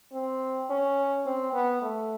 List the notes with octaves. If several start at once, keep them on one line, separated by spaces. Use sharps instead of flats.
C4
C#4
C4
B3
A3